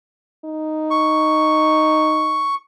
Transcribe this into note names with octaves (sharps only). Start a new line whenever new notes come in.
D#4
C#6